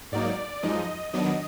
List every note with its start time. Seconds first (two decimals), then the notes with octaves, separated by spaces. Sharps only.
0.12 G#2 F#3 A#3 D#4 D5
0.63 F#2 F3 G#3 D#4 D#5
1.13 D#3 F#3 B3 D4 D#5